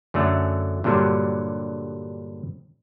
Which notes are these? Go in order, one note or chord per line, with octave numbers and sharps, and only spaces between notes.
F#2 D3 F#3 A3
G2 A#2 D3 F#3 G3